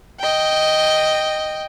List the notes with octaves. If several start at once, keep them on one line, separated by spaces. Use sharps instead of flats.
D#5 G5